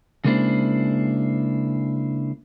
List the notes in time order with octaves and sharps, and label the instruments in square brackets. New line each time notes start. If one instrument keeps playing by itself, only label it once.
[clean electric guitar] C#3 G#3 A#3 D4 E4 C5